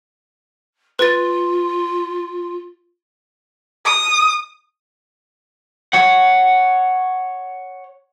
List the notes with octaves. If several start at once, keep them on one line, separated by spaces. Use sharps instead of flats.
F4 B4 A6
D#6
C#5 F#5